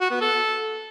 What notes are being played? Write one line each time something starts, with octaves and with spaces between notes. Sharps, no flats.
F#4
B3
A4